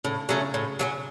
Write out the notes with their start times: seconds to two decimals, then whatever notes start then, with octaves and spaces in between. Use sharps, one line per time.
0.04 A2 C#3
0.29 C#3 F#3 A3 C#4
0.54 A2
0.79 F#3 A3 C#4